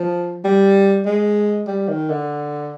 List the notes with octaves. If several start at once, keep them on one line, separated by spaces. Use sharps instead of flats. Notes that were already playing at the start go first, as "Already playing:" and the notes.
Already playing: F3
G3
G#3
G3
D#3
D3